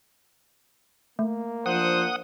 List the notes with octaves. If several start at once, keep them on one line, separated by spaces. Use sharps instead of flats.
A3 A#3
F3 D4 C5 F#5 D#6